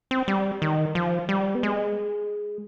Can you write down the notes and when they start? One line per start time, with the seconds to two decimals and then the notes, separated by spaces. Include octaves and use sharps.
0.11 C4
0.28 G3
0.62 D#3
0.95 F3
1.29 G3
1.55 B3
1.63 G#3